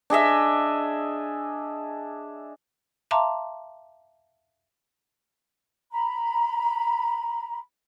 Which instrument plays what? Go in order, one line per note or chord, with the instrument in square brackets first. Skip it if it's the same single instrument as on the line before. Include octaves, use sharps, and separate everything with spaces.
[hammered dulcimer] D4 G#4 D#5 E5
[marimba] E5 F5 A5 A#5 C6 D6
[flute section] A#5 B5